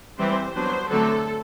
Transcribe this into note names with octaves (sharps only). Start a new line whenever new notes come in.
E3 G3 C4 C5
F#3 B3 D4 C5
D3 F#3 A3 C4 A4